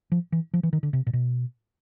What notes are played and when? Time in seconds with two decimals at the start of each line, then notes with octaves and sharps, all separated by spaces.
0.12 F3
0.32 E3
0.54 F3
0.63 E3
0.73 D#3
0.83 D3
0.93 C3
1.07 A#2
1.13 B2